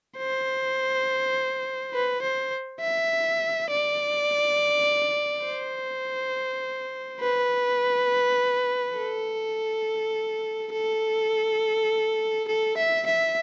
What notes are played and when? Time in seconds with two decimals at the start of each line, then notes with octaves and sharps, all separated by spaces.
0.18 C5
1.93 B4
2.22 C5
2.81 E5
3.70 D5
5.46 C5
7.20 B4
8.97 A4
10.72 A4
12.48 A4
12.77 E5
13.06 E5